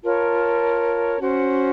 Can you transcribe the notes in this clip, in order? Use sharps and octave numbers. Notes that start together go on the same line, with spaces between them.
F4 A#4 C#5 A5
C#4 F#4 C5